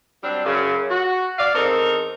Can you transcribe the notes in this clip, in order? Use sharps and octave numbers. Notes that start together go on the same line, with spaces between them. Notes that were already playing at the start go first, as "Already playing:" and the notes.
F#3 G3 C4 D4
F#2 C#3
F#4
D5 F5
E2 C4 D#4 A4 A#4